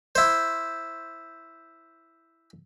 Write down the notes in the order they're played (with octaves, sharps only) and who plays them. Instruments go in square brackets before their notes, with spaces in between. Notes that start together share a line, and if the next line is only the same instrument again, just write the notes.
[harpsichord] E4 C5